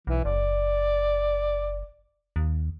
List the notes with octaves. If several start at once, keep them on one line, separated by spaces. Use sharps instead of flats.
B1 E3
F#1 D5
D#2